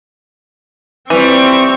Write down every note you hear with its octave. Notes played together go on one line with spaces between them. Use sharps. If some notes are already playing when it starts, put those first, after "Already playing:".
E3 F3 G3 C4 C#6